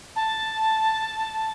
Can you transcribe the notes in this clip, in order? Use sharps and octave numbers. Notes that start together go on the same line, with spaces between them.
A5